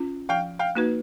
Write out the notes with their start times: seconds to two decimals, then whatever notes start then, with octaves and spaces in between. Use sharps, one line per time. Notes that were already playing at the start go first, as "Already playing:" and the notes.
Already playing: C#4 F4
0.29 F3 F5 G5
0.59 F5 G5
0.75 A#3 D#4 F#4 B4